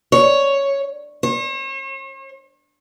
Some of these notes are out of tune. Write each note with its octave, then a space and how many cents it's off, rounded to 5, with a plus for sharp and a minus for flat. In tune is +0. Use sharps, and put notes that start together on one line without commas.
C#5 +0
C#5 -45